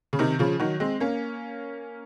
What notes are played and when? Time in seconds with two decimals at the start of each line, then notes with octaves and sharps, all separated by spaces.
0.13 C#3
0.19 C3 D#3
0.39 C#3 F3
0.60 D#3 F#3
0.80 G#3 C4
1.00 A#3 C#4